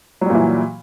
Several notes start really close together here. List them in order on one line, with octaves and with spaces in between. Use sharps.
F#3 G3 A#2 E3